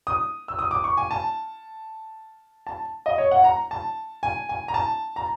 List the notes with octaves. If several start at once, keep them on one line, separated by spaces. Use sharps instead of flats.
D#6
E6
D#6
D6
C#6
G#5
A5
A5
D#5
C#5
F#5
A#5
A5
G#5
G#5
A#5
A5
A#5